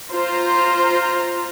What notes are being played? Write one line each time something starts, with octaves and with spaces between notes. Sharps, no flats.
F4 C5 A#5